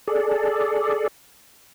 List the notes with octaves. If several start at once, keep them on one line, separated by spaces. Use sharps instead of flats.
G#4 A4 D5